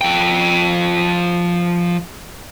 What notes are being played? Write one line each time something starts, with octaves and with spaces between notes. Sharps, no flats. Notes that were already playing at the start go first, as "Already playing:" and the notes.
F3 G5